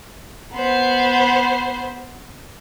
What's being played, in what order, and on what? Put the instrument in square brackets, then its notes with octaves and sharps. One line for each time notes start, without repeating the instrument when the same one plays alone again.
[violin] B3 C5